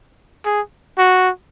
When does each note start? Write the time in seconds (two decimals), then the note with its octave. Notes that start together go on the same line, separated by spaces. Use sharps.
0.45 G#4
0.98 F#4